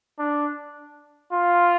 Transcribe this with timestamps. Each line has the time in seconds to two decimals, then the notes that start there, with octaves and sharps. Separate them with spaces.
0.19 D4
1.33 F4